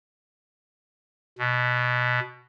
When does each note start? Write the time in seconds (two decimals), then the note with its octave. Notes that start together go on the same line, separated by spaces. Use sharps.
1.39 B2